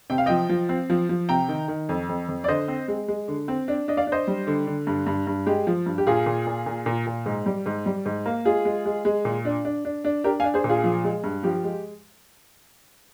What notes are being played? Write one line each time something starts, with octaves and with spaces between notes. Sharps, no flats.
C3 G5
F5
F3 D#5 G5
F3
C4
F3
F3
C3 G5 A#5
D#3
D#3
F2
F2
F2
D5
D3 C5 D#5
C4
G#3
G#3
D3
C4
D4
D4 D#5
D5 F5
D4
C5 D#5
G3
D3
D3
G2
G2
G2
G#3 G4
F3
G2
G4
A#2 F4 G#4
A#2
A#2
A#2
A#2
A#2
G#2
G3
G#2
G3
G#2
A#3
G#3 F4 G#4
G#3
G#3
G#3
A#2
D4
D4
D4
D4
D4 G4 A#4
F5 G#5
D4
G#4 C5
A#2
F4 G#4
F3
G#3
G2
F3 G4
G#3